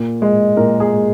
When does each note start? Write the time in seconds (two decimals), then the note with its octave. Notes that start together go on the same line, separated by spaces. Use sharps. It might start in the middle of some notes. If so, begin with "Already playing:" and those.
Already playing: A#2
0.22 G#3
0.57 A#2 A#4
0.80 G#4
0.92 G#3